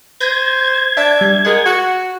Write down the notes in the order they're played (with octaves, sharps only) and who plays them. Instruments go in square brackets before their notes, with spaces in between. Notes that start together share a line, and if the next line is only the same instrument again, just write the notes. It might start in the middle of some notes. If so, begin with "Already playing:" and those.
[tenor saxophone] C5 [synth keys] G6 A#6 D#7 [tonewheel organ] G#6
[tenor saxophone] D4 [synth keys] E5 A5
[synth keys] G3
[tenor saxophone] G#3 [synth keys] G#4 A#4 F#5
[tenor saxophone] F#4 [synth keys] F#5